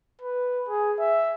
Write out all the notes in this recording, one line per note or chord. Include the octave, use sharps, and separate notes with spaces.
B4
G#4
E5